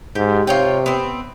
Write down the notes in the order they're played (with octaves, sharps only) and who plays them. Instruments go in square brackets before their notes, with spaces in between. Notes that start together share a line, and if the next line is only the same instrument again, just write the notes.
[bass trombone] G#2 [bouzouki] G4
[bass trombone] C3 [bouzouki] F4 C#5 G5
[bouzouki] B3 C4